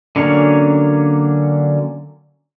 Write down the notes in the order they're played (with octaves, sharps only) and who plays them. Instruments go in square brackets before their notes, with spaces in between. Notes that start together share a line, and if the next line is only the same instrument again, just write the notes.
[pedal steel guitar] D3 F#3 A#3 C#4 C#5